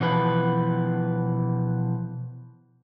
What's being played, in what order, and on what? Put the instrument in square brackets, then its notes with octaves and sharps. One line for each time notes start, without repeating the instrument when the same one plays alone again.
[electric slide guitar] B2 E3 F3 B4